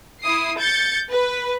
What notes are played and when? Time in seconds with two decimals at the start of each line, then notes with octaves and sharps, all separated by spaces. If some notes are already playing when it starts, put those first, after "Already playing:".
0.21 E4 D#6 C7
0.59 G6 A6 C#7
1.11 B4